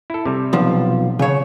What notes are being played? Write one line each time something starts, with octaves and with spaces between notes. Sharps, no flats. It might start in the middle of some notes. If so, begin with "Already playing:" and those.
E4 A4
C3 G3
B1 F3
C#3 C#5